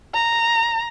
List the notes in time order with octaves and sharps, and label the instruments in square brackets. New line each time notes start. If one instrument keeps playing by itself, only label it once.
[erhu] A#5